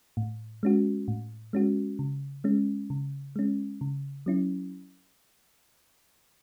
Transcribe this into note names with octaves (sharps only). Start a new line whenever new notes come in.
A2
G#3 C#4 F#4
A2
G#3 C#4 F#4
C#3
G#3 C#4
C#3
G#3 C#4
C#3
F#3 C#4 E4